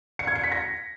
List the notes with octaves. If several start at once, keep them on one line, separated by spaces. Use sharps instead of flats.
C#7
G#6
C#7
B6
A#6